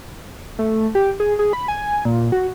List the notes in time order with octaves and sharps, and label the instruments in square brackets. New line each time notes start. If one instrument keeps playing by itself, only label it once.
[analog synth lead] A3
G4
G#4
G#4
B5
G#5
A#2
F#4